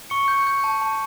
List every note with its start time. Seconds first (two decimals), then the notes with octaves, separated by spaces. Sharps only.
0.10 C#6 C#7
0.28 G6
0.47 G6
0.64 A5
0.81 A5